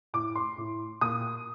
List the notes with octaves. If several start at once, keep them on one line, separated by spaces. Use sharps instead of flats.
A2 D6
C6
A2
A#2 D#6